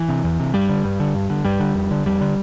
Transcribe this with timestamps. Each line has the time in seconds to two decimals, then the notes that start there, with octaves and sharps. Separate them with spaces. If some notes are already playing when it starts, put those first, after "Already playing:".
Already playing: E3
0.09 C3
0.24 E2
0.40 C3
0.54 G2 G3
0.69 D3
0.85 G2
1.00 D3
1.15 G2
1.30 D3
1.45 G2 G3
1.60 D3
1.75 F2
1.91 D3
2.06 F2 G3
2.21 D3